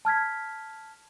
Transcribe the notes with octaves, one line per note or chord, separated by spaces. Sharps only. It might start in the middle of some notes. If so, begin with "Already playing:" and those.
A5 F6 G#6 B6